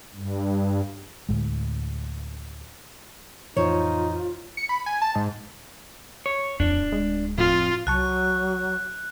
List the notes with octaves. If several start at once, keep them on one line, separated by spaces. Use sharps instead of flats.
G2
D2 A2 G#3
F2 A2 E3 D#4 F4 C5 C#5
C#7
B5
G#5
A5
G#2
C#5
D1 F2 D4
G#3
F2 A2 F4
C2 F#3 A5 C#6 F#6